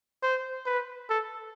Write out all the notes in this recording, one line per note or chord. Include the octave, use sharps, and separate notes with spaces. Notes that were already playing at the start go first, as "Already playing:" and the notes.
C5
B4
A4